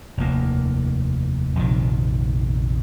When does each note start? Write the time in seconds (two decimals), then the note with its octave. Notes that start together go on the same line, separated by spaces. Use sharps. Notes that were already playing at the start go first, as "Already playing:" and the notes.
0.17 F1 D#2 A#3
1.55 A#1 F2 C3 D#3